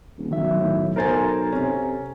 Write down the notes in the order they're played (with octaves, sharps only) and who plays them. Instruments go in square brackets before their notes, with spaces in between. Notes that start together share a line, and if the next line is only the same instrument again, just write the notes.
[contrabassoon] D#1
[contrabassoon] B1 [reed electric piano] D#3 F#3 E5
[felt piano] A2
[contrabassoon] B1 [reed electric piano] A4 A#5 A6 [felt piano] A#4 C5 G#5
[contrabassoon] C3 [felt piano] C#4